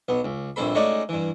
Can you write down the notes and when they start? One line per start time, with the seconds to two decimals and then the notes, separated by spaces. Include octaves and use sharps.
0.09 B1 B3
0.24 C#2
0.56 A#1 G2 C4 A4 B5
0.75 G#3 A3 C#4 D#4 F#4 D5
1.09 G2 E3